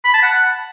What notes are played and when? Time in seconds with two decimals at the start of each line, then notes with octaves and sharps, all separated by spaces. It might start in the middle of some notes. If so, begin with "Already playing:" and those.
0.05 B5
0.14 A5
0.23 F#5